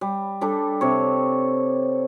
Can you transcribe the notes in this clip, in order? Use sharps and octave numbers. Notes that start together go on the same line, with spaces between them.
G3
G3 D4 A4
C3 C#5